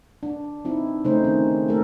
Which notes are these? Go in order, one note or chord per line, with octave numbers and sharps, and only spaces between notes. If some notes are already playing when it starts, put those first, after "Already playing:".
D4
C4 D#4 E4
C#3 A3 C#4 D#4 C5
D#3 C4
A3 A#3 F#4 A4 A#4